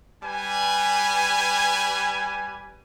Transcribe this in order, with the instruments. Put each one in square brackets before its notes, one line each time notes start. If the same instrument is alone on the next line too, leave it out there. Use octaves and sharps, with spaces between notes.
[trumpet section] G3 B4 G#5